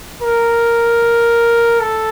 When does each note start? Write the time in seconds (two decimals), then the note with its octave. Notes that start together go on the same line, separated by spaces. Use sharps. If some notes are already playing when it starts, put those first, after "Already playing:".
0.22 A#4
1.80 A4